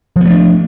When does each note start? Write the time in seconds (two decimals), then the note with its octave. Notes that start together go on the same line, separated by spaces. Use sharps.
0.16 F3
0.21 B3
0.25 A3
0.30 D4